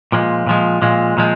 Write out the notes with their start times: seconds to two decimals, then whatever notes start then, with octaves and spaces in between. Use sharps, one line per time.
0.12 A#2 F3 G#3
0.46 A#2 F3 G#3
0.82 A#2 F3 G#3
1.17 A#2 F3 G#3